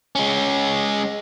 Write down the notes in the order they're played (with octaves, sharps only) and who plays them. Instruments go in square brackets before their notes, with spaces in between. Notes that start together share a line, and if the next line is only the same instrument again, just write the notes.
[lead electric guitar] G#3 C#4